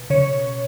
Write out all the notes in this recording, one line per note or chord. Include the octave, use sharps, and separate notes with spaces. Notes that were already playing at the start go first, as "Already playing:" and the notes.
Already playing: B2
C#3 C#5